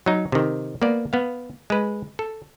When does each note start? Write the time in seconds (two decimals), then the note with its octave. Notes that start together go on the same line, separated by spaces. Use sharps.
0.06 F#3 D#4
0.32 C3 D#3
0.82 A#3 B3 D5
1.13 B3 F5
1.70 G#3 B4
2.19 A4